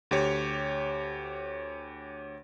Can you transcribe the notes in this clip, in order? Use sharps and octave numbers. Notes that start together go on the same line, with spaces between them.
D2 G4 C#5